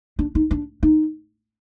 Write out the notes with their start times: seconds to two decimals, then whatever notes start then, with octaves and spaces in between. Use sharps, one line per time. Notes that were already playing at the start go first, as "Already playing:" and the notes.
0.19 D4
0.35 D#4
0.51 D4
0.83 D#4